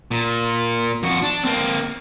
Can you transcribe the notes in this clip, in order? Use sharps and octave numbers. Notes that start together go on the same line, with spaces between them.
A#2
F2 F#4
D4
A#3 C4